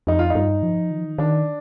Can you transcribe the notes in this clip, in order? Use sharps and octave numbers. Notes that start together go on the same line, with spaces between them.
F2 D#4
F4
D#4
G2
F3
D#3
F3
D#3
D#3 D4